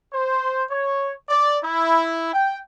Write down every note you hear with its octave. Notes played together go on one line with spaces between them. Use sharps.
C5
C#5
D5
E4
G5